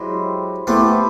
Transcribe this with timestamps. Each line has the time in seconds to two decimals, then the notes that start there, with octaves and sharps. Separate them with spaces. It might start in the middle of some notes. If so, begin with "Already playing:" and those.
Already playing: F#3 G#3 E4 G4 C5
0.67 A3 B3 E4 G4 C5